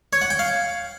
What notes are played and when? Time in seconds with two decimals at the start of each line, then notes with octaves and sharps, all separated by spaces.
0.13 C#5
0.22 F#5
0.30 G5
0.39 F5